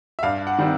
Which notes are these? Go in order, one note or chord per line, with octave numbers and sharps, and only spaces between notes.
E5
G2 F5
F#5
D#3 G3 C4